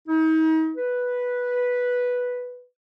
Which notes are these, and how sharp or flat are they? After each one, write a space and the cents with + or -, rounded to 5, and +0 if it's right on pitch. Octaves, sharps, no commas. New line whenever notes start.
D#4 +40
B4 -5